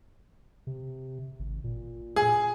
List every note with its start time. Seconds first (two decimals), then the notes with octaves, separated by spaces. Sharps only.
0.67 C3
1.39 G#1
1.64 A#2
2.16 G#4